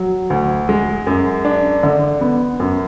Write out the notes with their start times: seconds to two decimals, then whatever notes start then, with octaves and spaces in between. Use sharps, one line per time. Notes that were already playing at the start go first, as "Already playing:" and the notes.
Already playing: F#3
0.30 D2
0.69 G#3
1.07 F#2
1.45 D4
1.83 D3
2.21 B3
2.60 F#2